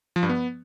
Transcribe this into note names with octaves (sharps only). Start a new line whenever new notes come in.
F3
G2
B3